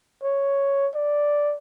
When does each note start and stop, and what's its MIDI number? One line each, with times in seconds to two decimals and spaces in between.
0.23 0.88 73
0.95 1.56 74